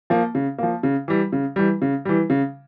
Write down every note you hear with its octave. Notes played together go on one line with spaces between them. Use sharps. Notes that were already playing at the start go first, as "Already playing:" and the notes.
F3 A#3
C#3
F3 A#3
C#3
E3 G3
C#3
E3 G3
C#3
E3 G3
C#3